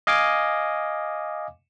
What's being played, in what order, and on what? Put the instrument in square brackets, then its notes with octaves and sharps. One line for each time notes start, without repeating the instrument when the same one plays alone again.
[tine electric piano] D#5 F5 G#5 D6